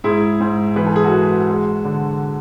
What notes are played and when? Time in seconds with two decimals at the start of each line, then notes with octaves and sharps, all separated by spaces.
0.04 G#2 E4 G#4
0.40 G#2
0.76 E3 B4
0.86 A4
0.96 G#4
1.04 F#4 A4
1.12 G#3
1.49 G#3
1.85 D3